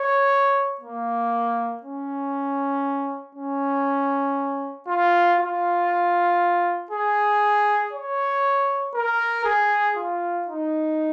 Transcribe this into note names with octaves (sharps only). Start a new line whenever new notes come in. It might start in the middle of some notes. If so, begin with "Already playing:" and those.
Already playing: C#5
A#3
C#4
C#4
F4
F4
G#4
C#5
A#4
G#4
F4
D#4